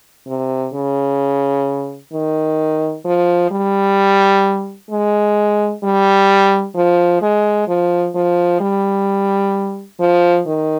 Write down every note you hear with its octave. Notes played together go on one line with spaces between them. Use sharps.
C3
C#3
D#3
F3
G3
G#3
G3
F3
G#3
F3
F3
G3
F3
D#3